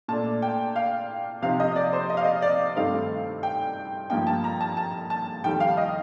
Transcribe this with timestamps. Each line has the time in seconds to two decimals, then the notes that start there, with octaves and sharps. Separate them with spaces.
0.08 A#2 A3 D4 A5
0.42 G5
0.76 F5
1.42 C3 F3 C4 D#4 F5
1.60 D#5
1.76 D5
1.93 C5
2.10 D#5
2.17 F5
2.24 D#5
2.42 D5
2.76 G2 D#3 A3 C4 F5
3.43 G5
4.10 G2 F3 A#3 D#4 G5
4.27 A5
4.44 A#5
4.61 A5
4.77 A5
5.10 A5
5.44 F2 D#3 G3 G5
5.60 F5
5.77 D#5